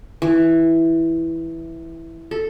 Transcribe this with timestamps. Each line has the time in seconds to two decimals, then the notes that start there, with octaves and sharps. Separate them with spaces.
0.22 E3
2.31 A4